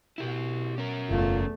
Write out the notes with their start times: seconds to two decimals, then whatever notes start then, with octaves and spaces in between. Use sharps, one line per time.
0.18 B2 E4 G4
0.78 C#4 A#4
1.10 F#1 E2 A3 F4